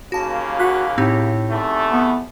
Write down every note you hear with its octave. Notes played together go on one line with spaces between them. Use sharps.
D#2 C#3 A#3 F#4 A5
F#4 F#6 B6
A2 C4 D#4 G4
E2 A3
B3